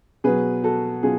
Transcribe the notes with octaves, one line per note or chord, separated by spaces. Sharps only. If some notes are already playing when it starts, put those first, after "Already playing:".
B2 F#3 G#4 B4
F#4 A4
B2 F#3 F4 G#4